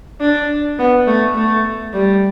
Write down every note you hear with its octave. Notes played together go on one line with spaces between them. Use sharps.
D4
B3
A3
A3
G3